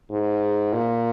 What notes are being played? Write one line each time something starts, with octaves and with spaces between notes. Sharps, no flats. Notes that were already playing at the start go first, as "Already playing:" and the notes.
G#2
A#2